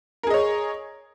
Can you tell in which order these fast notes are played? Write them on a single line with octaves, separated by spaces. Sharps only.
A#4 G#4 D#5 C#5